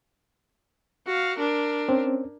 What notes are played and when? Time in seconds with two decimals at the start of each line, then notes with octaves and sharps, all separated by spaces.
1.07 F#4 F5
1.38 D4 A#4
1.89 C4 C#4